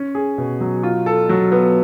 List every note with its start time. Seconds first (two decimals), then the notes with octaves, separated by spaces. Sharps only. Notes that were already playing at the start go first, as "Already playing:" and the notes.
Already playing: C#4
0.15 G#4
0.38 B2
0.61 F#3
0.83 F4
1.06 A4
1.29 F#3
1.52 B3